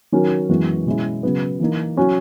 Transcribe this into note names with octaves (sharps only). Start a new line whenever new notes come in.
D#3 F#3 C#4 F#4 A#4
F#2 E3 G#3 B3 F#4
B2 G#3 C#4 E4
C#3 F#3 B3
E3 A#3 D#4
F#3 C#4 F#4